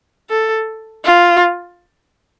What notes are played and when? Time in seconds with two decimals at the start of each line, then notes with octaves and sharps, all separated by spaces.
0.29 A4
1.05 F4